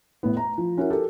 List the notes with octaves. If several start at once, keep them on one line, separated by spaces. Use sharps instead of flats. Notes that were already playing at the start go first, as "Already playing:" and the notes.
A1 A2 B3
A#5
F3
C#4 E4 F#4 A#4
G4 A4 A#4